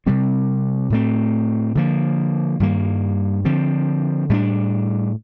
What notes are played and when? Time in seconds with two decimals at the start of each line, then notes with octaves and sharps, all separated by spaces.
0.06 C3 G3 C4
0.90 A2 A3 C4
1.75 D3 F3 A#3
2.60 G2 D#3 G3 A#3
3.45 D3 F3 C4
4.30 A2 G3 A#3 D4